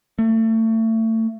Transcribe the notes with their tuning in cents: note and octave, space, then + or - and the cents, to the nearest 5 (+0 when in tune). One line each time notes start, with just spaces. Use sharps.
A3 +30